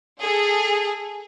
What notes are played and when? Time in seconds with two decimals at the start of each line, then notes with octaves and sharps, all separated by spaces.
0.19 G#4 A4